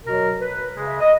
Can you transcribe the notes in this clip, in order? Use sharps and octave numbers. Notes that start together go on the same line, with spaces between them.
B2 F#3 A#4
B4
C#3 G#3
E5
D#5